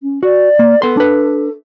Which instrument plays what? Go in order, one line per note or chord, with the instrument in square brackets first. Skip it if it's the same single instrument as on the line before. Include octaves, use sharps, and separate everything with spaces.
[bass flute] C#4
[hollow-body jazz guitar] F#4 [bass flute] D5
[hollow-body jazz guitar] A#3
[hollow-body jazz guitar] B3 C6 [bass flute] A4
[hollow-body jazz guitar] D4 B4